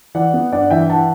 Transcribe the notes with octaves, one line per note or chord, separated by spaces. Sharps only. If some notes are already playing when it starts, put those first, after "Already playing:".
E3 D5 F#5
B3
G2 D5 F#5
E3 E5 G5
F#5 A5